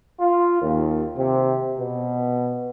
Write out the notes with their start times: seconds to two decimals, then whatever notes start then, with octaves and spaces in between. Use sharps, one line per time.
0.20 F4
0.62 D#2
1.18 C3
1.79 B2